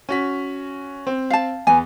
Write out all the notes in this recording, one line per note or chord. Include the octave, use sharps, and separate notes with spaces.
C#4 F#4 B6
C4
F5 A5
E2 B3 G#5